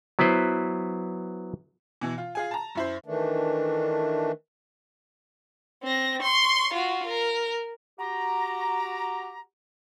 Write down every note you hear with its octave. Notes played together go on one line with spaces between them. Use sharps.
F#3 B3 E4 B4 C5
B2 E3
F4
F4 G#4 G#5
A5 A#5
F#2 E4 C5
D#3 E3 A3 D4
C4 A#6
C6 C#6
F4 F#4
A#4
F#4 G4 A#5